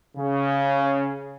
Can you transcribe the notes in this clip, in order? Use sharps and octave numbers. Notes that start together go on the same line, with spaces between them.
C#3